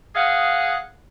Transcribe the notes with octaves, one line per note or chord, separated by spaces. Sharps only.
G#4 D#5 F5 F#5